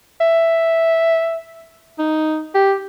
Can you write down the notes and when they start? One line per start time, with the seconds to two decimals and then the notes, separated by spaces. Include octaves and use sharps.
0.21 E5
1.99 D#4
2.55 G4